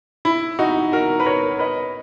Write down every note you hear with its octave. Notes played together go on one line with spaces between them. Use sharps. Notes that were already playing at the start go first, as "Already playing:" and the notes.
E4
D#4 F#4
F#4 A#4
B4
A#4 C#5
B4 D#5